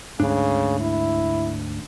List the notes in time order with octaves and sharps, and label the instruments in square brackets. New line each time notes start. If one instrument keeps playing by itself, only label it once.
[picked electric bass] D2 G#2 D4 [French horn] C#3
[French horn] E4